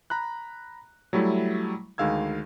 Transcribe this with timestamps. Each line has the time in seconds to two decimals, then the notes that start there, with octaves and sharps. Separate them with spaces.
0.10 A#5 B5 F#6
1.13 F#3 G3 A3 E4
1.98 D2 D#3 G#3 F5 E6 G#6